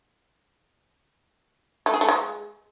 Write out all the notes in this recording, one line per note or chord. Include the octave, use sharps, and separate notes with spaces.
A3
G#4
A3
G#3